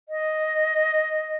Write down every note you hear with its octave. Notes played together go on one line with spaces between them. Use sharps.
D#5